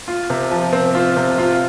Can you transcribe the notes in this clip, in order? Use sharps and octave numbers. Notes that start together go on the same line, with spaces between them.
F4
C3
F3
C4
F4
C3
F4